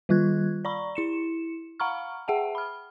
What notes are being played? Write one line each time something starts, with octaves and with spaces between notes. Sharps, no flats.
D#3 G3 F4 F#6 G#6
D5 A#5 B5 C#6
E4 C#7 E7
F5 F#5 A#5 B5 C#6 F6
G#4 E5 F#5 G5 A5
B5 F6